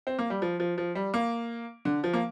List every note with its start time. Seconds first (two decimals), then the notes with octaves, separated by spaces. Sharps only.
0.07 C4
0.19 A#3
0.30 G3
0.42 F3
0.60 F3
0.78 F3
0.95 G3
1.14 A#3
1.85 D3
2.04 F3
2.13 A#3